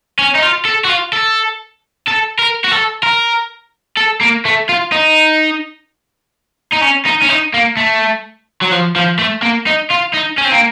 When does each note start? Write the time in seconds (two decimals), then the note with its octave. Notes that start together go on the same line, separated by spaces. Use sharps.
0.19 C#4
0.35 D#4
0.42 F4
0.65 A4
0.84 F#4
0.89 F4
1.13 A4
2.07 A4
2.39 A#4
2.65 F#4
2.72 A4
3.03 A#4
3.97 A4
4.21 A#3
4.45 A3
4.69 F4
4.92 D#4
6.73 D#4
6.82 C#4
7.06 D#4
7.23 C#4
7.30 D#4
7.54 A#3
7.77 A3
8.62 F#3
8.71 F3
8.96 F3
9.19 A3
9.42 A#3
9.66 D#4
9.90 F4
10.13 D#4
10.38 C#4
10.45 C4
10.52 A#3